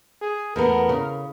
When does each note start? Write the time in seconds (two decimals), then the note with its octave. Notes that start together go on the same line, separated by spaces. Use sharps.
0.22 G#4
0.56 E2 A3 B3 A#4
0.89 C#3